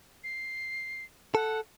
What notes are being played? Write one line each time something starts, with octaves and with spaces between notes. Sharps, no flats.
C7
A4 F#5